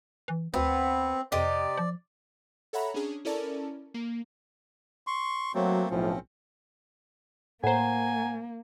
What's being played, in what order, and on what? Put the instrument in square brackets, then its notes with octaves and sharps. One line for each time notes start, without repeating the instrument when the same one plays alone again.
[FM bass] E3
[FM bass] D2 [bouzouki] B3 [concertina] C4
[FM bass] F2 [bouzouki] C3 G4 D#5 [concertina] D5
[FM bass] F3
[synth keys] A4 C#5 E5 F#5 A#5 B5
C#4 D4 G#4
C#4 E4 A4 A#4 D5 A5
A#3
[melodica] C6 C#6
[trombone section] F#3 [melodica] A3 A#3 C4
[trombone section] B1 A2 F3 [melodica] C4 C#4
[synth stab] A2 C5 [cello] A#3 [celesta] F#5 A#5 [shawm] G#5